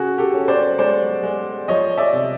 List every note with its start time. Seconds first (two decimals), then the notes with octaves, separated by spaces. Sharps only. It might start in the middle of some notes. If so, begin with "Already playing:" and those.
Already playing: C#3 F#4 G#4
0.18 G4 A4
0.34 C#4
0.48 C5 D5
0.78 G#3 C5 D5
1.23 G#3
1.68 F3 C#5 D#5
1.98 D5 E5
2.13 C3